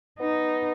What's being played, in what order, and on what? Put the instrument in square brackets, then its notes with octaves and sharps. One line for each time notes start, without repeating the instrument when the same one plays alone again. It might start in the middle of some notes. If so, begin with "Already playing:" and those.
[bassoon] B3 [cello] D#4